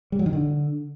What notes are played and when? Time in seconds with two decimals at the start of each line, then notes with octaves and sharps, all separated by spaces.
0.12 G3
0.19 F#3
0.26 D#3
0.33 D3